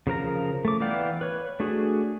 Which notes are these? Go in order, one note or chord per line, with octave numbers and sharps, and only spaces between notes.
C#3 F3 A#4 A#5
A3 D6
E3 B3 D5 F5 G5
B4 C#5
A3 D4 F#4 G#4